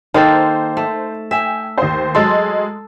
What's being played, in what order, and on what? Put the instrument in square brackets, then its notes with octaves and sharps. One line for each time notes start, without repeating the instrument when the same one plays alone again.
[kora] D#3 A#3 A4 [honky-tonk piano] C5
[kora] A3
[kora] E5 [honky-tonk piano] G5 G#5
[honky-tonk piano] D#2 C5
[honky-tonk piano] F#3 G#3 C6 [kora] A4